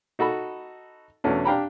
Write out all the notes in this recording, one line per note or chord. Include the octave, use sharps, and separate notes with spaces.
D#4 F#4 A4 B5
E2 B2 A3 C#4 D4
D4 G4 F5 G5 A#5 B5